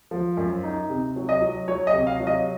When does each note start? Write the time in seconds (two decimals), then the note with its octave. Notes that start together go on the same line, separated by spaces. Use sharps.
0.11 F3
0.37 F#2
0.63 D#4
0.89 C3
1.16 F#3
1.29 D#5
1.41 F#3
1.68 F#3 C#5
1.87 D#5
1.93 C3
2.07 F5
2.20 F#3
2.27 D#5